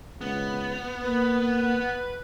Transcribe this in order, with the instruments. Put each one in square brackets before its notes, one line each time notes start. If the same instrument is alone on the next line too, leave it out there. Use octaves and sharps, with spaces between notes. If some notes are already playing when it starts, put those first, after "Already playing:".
[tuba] C#2 [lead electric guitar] B3
[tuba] A#3 [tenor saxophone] B4